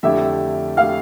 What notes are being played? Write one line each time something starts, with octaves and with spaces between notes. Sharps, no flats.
F2 D3 A3 E4 G4 E5
D3 A3 E4 G4 F5